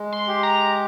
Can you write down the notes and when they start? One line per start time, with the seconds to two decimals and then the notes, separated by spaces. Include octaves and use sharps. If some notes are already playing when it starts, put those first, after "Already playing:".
Already playing: G#3
0.12 C6
0.28 G4
0.43 A#5